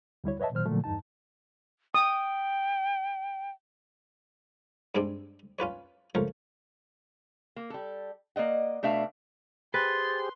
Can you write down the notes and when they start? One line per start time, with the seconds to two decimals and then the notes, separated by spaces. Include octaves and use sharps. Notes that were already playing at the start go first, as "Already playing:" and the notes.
0.24 D2 G3 E4 C#5
0.40 B4 C#5 D#5 E5 A5
0.52 A#2 D#3 F#3 C5 F6
0.66 A#2 D3 F3 F#3 A3
0.84 E2 G2 D#4 A5
1.94 G5 D#6
4.95 G2 G3 G#3 C4 D4
5.59 C#4 F4 B4 C#5
6.15 C#2 F3 A3 A#4 C#5
7.56 A#3
7.70 G3 A4
8.36 A#3 D5 D#5 F#5
8.83 B2 A3 D4 E5 F5
9.74 G4 G#4 B4 C5 C6 A6